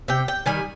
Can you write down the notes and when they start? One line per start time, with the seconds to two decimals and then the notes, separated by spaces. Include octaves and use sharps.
0.08 C3 G5
0.28 G5
0.46 D#3 G3 G#5